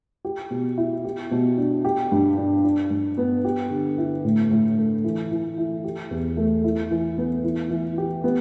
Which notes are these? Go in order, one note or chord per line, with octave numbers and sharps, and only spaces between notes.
G4
B2
E4
G4
B2
D4
G4
G2
D4
D4
G2
B3
G4
D3
E4
A2
A2
A3
E3
E3
E4
G4
E2
A3
E4
E3
B3
E3
E3
G4
B3